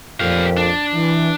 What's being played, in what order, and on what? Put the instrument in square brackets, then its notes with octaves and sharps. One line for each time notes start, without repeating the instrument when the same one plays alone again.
[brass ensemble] F2 A#2 [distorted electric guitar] G4 F5
[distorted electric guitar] D4
[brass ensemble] E3